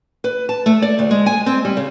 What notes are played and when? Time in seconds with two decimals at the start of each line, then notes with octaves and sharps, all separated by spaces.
0.24 B4
0.49 A5
0.66 A3
0.82 D5
0.99 D2
1.11 G#3
1.26 G#5
1.46 C4
1.65 G3
1.77 C#3